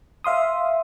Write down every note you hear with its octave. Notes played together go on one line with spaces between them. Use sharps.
E5 F5 C6 D#6